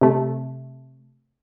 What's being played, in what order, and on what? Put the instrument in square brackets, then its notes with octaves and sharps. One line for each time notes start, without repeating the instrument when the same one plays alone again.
[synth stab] C3 A3